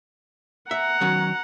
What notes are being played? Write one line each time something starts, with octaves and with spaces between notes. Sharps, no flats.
E5 F#5 A#5
D#3 F#3 C#4